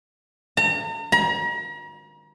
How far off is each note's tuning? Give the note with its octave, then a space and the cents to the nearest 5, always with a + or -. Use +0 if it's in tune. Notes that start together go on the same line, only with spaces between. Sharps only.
A#5 -40
A#5 +40